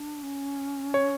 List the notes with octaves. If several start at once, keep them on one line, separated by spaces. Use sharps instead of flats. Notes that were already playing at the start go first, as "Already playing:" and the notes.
Already playing: D4
C#4
C#5